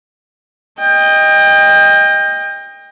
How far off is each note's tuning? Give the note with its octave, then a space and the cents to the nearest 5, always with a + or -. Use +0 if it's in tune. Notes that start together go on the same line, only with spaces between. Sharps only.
D#5 +0 G5 +30